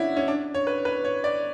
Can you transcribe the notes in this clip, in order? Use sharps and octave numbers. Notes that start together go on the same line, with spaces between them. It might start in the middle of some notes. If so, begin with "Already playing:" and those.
Already playing: C#4 D4 E4 F#4
C#4
D4
C#5
B4
B4
C#5
D5